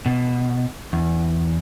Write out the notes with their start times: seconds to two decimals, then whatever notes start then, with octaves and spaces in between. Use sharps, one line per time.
0.06 B2
0.93 E2